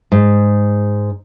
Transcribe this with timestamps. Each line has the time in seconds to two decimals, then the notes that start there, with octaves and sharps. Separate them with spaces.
0.12 G#2